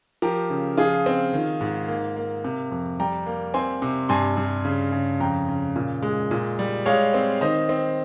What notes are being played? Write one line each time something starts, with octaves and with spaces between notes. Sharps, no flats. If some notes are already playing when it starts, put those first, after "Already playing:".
F3 G4 A#4
C#3
F3 F4 G#4
C4
D#3
G#2
A#3
A#3
C3
F2
G3 G5 A#5
A#3
C4 G#5 C6
C3
G2 G#5 C6
G2
C#3
C#3
F2 G5 A#5
C#3
A#2
G#3
A#2
G3
G#3 C#5 F5
C4
D#3 C5 D#5
C4